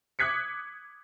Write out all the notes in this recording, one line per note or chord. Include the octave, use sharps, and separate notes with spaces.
D6 D#6 F#6 G#6 B6 C#7